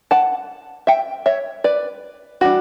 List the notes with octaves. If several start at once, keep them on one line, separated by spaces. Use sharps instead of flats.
F#5 A5
E5 G5
C#5 E5
B4 D5
E3 G3 D4 F#4